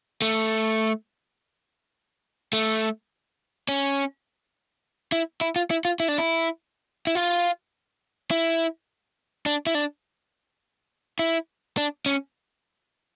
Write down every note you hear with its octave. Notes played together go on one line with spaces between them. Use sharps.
A3
A3
C#4
E4
E4
F4
E4
F4
E4
D4
E4
E4
F4
E4
D4
E4
D4
E4
D4
C#4